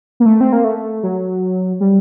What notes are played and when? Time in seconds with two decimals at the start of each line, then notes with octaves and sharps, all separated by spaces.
0.20 A#3
0.26 A3
0.41 C4
0.52 A#3
0.64 A3
1.03 F#3
1.80 G3